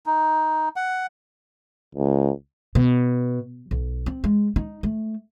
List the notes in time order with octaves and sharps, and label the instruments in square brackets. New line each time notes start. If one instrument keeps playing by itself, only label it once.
[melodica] D#4
F#5
[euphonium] C#2
[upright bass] B2
B1
C4
G#3
D#4
A3